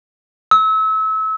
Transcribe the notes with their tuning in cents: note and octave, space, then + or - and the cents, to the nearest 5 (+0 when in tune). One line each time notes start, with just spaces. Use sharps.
E6 -30